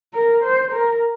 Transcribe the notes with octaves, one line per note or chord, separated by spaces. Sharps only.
A#4
C5
A#4